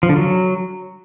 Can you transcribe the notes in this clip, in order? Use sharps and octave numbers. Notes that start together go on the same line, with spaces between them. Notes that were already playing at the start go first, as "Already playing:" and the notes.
F3
D3
F#3